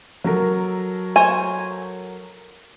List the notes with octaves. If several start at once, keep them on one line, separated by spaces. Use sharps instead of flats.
F#3 A4 A#4
C5 C#5 G#5